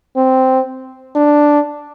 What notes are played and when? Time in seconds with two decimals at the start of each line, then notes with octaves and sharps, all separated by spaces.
0.16 C4
1.15 D4